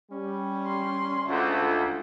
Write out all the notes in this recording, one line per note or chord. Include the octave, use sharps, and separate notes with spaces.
G3 C#4
C6
D2 G#3 F4 E5 F#5